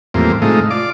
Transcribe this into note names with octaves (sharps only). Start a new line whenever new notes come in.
E2 A2 F3 G3 A#3 C4
A2 C3 G#3 A3 D#4 F4
F4 D5 D6